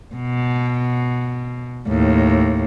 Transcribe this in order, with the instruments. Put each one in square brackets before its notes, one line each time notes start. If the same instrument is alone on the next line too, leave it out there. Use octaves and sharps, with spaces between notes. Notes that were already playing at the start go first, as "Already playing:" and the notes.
[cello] B2
D#2 A2